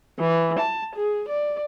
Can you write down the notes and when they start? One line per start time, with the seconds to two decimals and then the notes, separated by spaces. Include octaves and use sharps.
0.20 E3
0.59 A5
0.96 G#4
1.29 D5